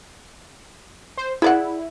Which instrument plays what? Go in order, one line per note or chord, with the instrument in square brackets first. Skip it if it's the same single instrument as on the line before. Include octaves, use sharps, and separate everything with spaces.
[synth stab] C5
[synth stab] E4 [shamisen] G#4 D5 F#5